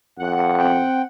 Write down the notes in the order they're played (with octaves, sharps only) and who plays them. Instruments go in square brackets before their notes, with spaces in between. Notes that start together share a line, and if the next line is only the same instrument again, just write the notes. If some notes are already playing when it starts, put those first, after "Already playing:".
[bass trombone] F2 [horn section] F#5
[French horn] C4 [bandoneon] G5